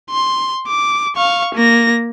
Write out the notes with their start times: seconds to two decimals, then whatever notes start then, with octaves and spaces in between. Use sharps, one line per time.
0.10 C6
0.67 D6
1.16 F5 C#6
1.55 A#3 A#6